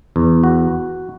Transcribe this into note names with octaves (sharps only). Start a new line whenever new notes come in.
E2
F#4